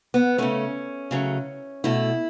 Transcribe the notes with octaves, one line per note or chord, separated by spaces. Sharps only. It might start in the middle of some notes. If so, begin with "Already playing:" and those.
B3
C#3 A3 C#4
C#3 F#3 A3
B2 A3 E4